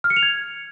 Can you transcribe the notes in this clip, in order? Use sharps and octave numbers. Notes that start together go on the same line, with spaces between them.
F6
C#7
F7
G#6